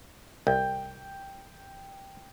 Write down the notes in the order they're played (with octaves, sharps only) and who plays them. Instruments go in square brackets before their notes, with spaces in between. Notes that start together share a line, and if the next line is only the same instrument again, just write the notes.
[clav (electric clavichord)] C2 [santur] G5